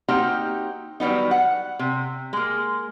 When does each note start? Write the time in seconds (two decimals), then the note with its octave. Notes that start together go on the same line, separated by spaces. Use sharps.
0.08 A#3 C4 D#4 F#4 G4 A#5
1.00 D#3 F#3 G3 B3 D#4
1.31 F#5
1.79 C3
2.33 G#3 A#3